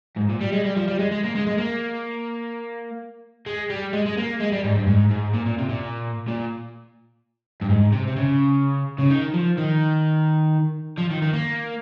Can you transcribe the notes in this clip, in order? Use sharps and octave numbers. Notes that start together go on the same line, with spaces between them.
G#2
A#2
G3
G#3
G3
F3
G3
G#3
G#3
A#3
G#3
G#3
A#3
G#3
G3
G#3
G#3
A#3
G#3
G3
G#2
G2
G#2
G#2
A#2
A#2
C3
A#2
A#2
G2
G#2
C3
C3
C#3
C#3
D#3
F3
D#3
F3
D#3
D#3
A#3